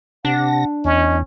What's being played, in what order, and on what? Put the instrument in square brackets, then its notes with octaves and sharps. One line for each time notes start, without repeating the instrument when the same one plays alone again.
[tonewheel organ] C3 A#6 [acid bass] D4 [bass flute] F#5
[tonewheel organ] E2 [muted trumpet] C#4 [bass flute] D#5